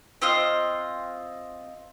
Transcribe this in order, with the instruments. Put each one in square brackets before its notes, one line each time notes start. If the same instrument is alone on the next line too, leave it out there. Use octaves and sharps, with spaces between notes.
[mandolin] C4 F4 D#5 F5